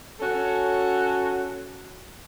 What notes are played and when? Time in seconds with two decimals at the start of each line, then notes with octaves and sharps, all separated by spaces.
0.20 C#4 F#4 A4